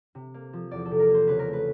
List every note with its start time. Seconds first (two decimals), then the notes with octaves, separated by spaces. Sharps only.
0.15 C3
0.34 A#3
0.53 F3
0.71 E2 D5
0.85 A4
0.91 C3
1.00 A#4
1.10 A#3 C5
1.28 C#3 B4
1.39 A#4
1.48 A3
1.53 B4